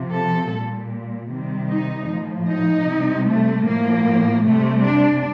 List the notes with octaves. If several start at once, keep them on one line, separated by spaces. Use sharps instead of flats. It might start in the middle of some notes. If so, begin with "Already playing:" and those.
Already playing: C3 F3
A4
A#2 G3
C3 D#3 G3
D#4
A2 F3
D#4
C3 G3
A3
A2 F3 A#3
C3 G3 A3
D4